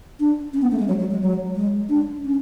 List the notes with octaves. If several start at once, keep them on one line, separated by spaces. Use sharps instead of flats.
D4
C#4
B3
A3
G#3
F#3
F#3
G#3
F#3
G#3
D4
C#4